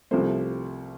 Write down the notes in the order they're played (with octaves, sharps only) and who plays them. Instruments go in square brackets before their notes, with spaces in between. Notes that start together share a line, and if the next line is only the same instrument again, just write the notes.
[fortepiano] C2 C3 F3 A3 C5